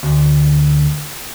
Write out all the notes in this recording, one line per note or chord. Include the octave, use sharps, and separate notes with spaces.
D2